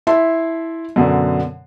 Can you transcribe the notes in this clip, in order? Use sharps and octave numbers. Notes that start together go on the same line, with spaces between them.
E4 E5 A5 C6
F#2 B2 D3